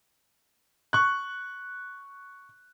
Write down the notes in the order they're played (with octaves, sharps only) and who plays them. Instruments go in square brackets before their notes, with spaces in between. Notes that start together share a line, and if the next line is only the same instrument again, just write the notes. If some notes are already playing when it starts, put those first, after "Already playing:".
[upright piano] C#6 F#6